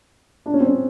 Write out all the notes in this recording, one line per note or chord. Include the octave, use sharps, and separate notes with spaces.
D4
C#4
C4
C#4